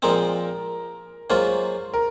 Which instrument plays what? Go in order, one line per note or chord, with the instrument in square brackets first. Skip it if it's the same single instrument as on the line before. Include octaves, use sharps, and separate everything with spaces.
[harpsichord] A#2 F3 G#3 C4 [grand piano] A#4
[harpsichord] G#2 F#3 A#3 F4 [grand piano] C5
[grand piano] A#4